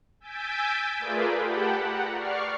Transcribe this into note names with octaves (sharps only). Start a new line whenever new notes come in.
G#5 E6 G6 A6 B6 D7
A3 F4 G#4 A#4 B4 D5
G4 F#5 G5 A5 B5
F#5 A#5
D5 C#6 F6 C7